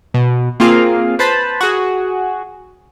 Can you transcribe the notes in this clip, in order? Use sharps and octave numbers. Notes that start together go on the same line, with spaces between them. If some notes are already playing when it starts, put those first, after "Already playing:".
B2
A#3 C4 F4 G#4 F5
B4 C5 A5 B5
F#4 G#4